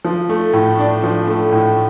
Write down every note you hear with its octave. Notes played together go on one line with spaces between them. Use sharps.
F3
A3
A2
D4
F3
A3
A2